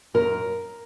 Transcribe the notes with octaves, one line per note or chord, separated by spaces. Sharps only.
F#2 A#4